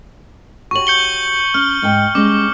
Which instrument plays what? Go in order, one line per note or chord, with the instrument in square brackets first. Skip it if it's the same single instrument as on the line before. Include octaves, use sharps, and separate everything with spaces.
[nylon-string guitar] F#4 G4 C#5 [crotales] C#6 F#7
[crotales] G6 C#7 G7
[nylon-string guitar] C#4 [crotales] F6
[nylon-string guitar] G#2 G5
[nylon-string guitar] G3 G#3 C#4 [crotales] D6